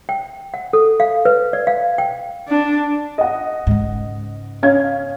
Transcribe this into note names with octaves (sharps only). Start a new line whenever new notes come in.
G5
F#5
A4
F5
B4
D5
F5
G5
D4
D#5 F#5
G#2 C#3
C#4 F5 G#6